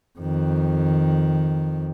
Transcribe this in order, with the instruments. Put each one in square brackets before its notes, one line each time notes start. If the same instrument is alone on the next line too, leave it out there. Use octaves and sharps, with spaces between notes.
[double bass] F2 D#3